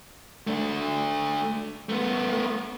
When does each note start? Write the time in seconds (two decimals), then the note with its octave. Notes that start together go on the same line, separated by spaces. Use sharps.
0.47 A3 D4
1.89 A3 B3